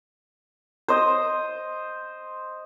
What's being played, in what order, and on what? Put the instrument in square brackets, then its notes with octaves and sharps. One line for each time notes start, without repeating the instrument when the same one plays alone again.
[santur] C5 D#5